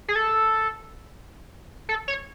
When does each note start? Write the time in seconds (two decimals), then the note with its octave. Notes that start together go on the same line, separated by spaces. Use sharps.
0.08 G#4
0.16 A4
1.89 A4
2.08 C#5